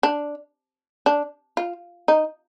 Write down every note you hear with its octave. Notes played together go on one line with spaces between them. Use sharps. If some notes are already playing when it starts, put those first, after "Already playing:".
D4
D4
F4
D#4